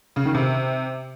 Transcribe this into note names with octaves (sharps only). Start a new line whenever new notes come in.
C#3
D#3
C3